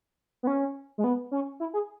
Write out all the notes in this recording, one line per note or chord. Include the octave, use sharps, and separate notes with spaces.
B3
C#4
G#3
B3
C#4
E4
G#4